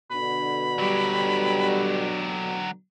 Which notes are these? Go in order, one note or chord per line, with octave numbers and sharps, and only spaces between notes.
B2 D3 B5
F#3 G3 G4